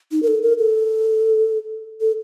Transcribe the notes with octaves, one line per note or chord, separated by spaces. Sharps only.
D#4
A#4
A4
A#4
A4
A4